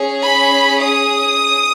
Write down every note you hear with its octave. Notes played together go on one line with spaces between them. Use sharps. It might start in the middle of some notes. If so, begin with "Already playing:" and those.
Already playing: C#4 G#4
B5
D#6